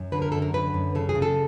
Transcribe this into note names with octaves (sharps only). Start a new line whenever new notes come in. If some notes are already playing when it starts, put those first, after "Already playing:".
Already playing: F#2
D3 B4
A#4
F#2 A4
A#4
D3 B4
F#2
C#3 A4
G#4
C#3
A4